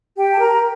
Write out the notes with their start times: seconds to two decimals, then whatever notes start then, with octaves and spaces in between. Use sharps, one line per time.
0.18 G4 G5
0.33 A5
0.40 A#4 A#5